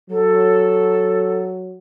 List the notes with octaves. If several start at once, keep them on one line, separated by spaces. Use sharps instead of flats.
F#3 A4